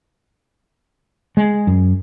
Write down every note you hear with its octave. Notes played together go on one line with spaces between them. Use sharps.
G#3
F#2